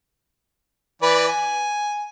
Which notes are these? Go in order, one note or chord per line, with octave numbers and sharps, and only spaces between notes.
E3 B4 D5
G#5